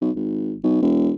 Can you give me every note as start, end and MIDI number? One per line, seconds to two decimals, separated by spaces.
0.01 0.10 35
0.16 0.54 32
0.63 0.79 35
0.82 1.12 28